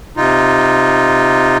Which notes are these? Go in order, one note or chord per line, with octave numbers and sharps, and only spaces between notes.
C3 D#4 F4